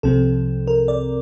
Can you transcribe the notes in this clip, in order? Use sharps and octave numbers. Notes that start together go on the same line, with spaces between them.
C2 C3 F3 C4 A4
A#4
D5